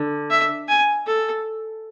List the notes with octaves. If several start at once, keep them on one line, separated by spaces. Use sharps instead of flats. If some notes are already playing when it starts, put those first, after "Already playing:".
Already playing: D3
E5
G#5
A4